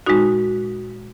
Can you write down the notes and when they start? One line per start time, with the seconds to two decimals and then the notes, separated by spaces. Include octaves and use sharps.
0.06 A#2 G#3 D#4 F#4